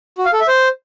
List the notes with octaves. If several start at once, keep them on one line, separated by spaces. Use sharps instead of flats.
F#4
F5
A4
E5
C5